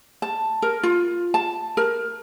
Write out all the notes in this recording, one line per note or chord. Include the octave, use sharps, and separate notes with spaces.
A5
A#4
F4
A5
A#4